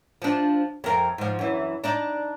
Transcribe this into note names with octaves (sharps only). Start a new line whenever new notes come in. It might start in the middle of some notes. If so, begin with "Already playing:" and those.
F3 D4
F2 A#4
G#2 F3
F#2 E3
D4 D#4 D5